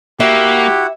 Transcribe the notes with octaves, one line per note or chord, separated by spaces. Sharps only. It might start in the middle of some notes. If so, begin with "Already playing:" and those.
A#3 E4 F#4 G4 E5 F#5